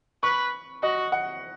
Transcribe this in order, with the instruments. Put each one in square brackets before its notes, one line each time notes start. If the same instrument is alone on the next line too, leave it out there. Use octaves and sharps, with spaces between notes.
[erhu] B4 [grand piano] C#6
[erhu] F#4 [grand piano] D#5
[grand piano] F#5